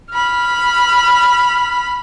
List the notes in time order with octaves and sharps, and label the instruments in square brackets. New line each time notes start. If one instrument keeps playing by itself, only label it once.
[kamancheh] B5 F6